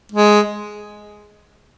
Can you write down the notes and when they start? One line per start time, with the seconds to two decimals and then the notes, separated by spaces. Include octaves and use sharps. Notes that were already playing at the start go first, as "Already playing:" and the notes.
0.12 G#3